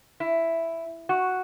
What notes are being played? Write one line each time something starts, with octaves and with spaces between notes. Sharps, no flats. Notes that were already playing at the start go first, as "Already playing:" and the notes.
E4
F#4